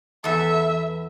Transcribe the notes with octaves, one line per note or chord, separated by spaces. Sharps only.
E2 A4 E5